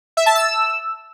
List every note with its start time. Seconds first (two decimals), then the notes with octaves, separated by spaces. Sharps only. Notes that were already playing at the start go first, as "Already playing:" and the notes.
0.17 E5
0.26 A5
0.35 E6